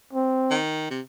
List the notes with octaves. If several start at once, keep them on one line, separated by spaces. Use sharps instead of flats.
C4
D#3
C3